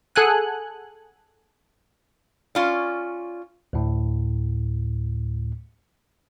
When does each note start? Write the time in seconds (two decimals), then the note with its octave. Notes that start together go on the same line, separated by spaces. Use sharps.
0.16 G#4 A4 F#5 G#5 F#6
2.55 C#4 F4 D5
3.73 D2 A2